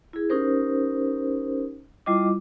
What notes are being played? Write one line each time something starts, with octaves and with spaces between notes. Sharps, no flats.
E4 G#4
C#4 D#4 G4 A#4 C5
G3 E4 F4 D#5 D6